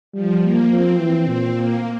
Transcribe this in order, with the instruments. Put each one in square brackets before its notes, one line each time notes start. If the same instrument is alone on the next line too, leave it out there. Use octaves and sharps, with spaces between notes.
[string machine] F3 [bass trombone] G3
[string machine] A#3
[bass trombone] F3 [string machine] C4
[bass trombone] E3
[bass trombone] A#2 [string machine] C4
[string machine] A#3